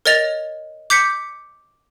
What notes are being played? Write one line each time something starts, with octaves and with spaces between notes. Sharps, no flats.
A#4 C#5 D#5 A6 F7
D6 G6 B6 C#7